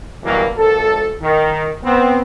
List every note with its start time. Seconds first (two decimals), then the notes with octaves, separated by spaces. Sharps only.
0.24 F#2 B2 E3 F#3 G3 A#3
0.56 G#1 A4
1.21 D#3
1.84 B3 C4